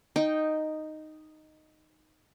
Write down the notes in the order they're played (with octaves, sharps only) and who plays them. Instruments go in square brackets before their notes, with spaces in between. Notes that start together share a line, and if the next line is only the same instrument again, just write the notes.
[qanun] D#4 G5